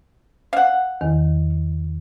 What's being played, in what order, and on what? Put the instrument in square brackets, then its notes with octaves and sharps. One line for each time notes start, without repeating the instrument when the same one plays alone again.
[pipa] F5 F#5
[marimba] E2 D#3